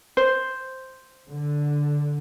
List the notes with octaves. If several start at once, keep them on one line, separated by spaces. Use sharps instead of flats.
C5
D3